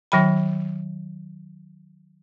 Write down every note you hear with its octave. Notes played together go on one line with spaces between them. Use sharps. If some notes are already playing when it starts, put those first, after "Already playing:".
D#3 F#3 G5 B5